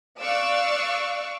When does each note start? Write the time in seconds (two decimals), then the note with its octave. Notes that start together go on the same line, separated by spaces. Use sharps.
0.20 D5 F5 C#6 D6 E6 F#6